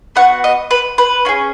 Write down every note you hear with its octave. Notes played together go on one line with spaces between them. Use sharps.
B3 F#4 F#5
D#5
B4
B4
C#4 F4 G#4